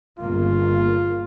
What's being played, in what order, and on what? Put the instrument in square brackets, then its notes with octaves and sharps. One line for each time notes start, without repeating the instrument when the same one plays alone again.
[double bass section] G1 C#3 A#3 [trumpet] F4